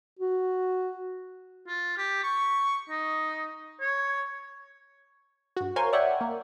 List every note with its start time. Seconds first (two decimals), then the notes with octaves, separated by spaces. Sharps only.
0.19 F#4
1.68 F4
1.98 G4
2.23 C#6
2.90 D#4
3.81 C#5
5.57 G2 F#4
5.76 A#4 C5 C#5 F5 G#5 C6
5.93 C#5 D5 E5 F#5 G5 C#6
6.21 A#3